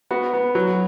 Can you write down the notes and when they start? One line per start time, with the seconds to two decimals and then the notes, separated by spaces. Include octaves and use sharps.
0.11 B3 F#4
0.33 B3
0.55 F#3